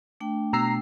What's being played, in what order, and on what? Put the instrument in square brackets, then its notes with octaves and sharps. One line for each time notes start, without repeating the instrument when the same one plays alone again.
[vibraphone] A3 D4 G5
[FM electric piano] B2 E6 C7 [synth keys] A#5